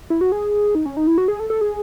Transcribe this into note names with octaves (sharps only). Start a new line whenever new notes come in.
E4
F#4
G#4
D#4
C#4
D#4
E4
F#4
G#4
A4
A4
G#4